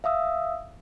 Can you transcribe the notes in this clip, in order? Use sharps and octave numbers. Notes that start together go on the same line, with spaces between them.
E5 F5 D#6 E6